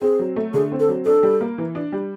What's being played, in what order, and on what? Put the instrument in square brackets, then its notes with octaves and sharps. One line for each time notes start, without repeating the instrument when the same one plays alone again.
[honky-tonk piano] C4 [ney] G#4
[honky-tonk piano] F#3
A3
[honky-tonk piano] D3 [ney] G#4
[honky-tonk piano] C4
[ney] A4
[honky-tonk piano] F#3
[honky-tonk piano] D4 [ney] A4
[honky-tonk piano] G3
A#3
E3
D4
G3